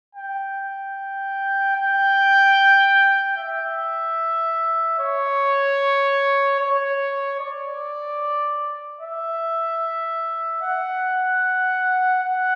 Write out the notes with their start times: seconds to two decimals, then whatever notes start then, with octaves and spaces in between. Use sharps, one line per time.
0.15 G5
1.76 G5
3.37 E5
4.99 C#5
6.59 C#5
7.40 D5
9.01 E5
10.62 F#5
12.23 F#5